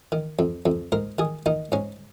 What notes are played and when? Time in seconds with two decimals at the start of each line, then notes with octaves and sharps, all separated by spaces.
0.12 D#3
0.39 F2
0.66 F2
0.92 G#2 A#4
1.19 D#3 G#4
1.46 D#3 D#4
1.72 G#2 C#4